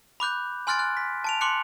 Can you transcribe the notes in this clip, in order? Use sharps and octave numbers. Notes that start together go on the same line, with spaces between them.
B5 D6 F#6 G6
G#5 C6 F6 F#6 A6 D7
F#6
B6
A5 D7 F7
C6 D6 F#6 C#7